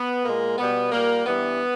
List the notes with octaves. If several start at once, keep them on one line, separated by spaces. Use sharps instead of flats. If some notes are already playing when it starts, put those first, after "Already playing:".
Already playing: B3
A#2 G#3 A#3
B2 G3 B3
A#2 G3 A#3
G2 E3 G3 B3